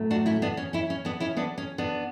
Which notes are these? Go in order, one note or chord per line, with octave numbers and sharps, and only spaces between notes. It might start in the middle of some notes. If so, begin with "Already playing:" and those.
Already playing: A2 F#3 A3
D4 F#4
C#4 E4
B3 D4
C#4
C#4 E4
C#4
B3 D4
C#4 E4
B3 D4
C#4
B3 D4